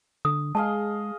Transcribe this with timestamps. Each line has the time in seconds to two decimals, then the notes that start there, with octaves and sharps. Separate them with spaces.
0.25 D3 D#6
0.55 G#3 G#4 D#5 F5 A5